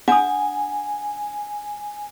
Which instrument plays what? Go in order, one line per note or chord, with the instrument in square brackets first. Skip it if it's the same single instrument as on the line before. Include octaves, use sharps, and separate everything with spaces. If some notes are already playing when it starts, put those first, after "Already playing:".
[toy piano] D4 [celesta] F#5 D#6 [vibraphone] G#5